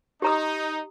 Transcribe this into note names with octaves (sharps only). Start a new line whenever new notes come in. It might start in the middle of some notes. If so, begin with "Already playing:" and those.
D#4 G4 A#5 D#6